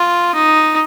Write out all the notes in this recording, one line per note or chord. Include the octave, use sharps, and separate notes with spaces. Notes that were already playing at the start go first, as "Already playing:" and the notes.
Already playing: F4
D#4